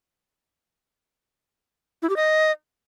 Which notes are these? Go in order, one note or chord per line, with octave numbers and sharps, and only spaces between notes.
E4
G4
D#5